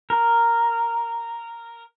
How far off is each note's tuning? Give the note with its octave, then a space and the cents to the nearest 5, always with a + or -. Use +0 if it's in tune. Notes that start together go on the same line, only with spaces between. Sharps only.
A#4 -5